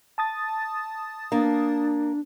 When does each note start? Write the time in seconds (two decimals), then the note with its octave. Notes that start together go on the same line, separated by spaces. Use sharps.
0.18 A5 D#6 A6
1.32 A#3 D4